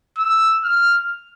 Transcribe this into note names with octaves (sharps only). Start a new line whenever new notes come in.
E6
F6